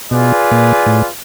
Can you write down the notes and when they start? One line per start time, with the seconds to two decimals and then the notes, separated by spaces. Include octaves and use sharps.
0.11 B2 F4 G#4 B4 D5
0.52 A#2
0.86 A2